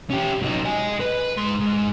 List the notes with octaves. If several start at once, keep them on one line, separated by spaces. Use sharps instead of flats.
C#4 G4
F#3 D#4
D#5 G#5
B4
G#2 C6
G#2